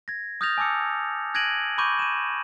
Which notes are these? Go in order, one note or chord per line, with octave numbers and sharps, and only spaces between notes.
G#6 A#6
D#6 F6 G6 A6 A#6 F7
G#5 A5 D6 E6 C#7
F#6 G#6 A#6 D7 D#7 F#7
B5 C#6 D6 G6 D#7
D#7 E7